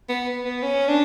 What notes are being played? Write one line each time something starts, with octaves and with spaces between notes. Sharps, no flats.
B3
B3
C#4
D4